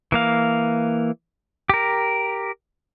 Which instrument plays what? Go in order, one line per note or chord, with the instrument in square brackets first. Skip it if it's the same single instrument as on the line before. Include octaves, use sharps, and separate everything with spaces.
[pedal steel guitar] E3 A#3 F5
G4 A#4